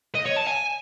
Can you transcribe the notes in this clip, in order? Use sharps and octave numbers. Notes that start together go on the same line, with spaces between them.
D#5
C#5
A5
G#5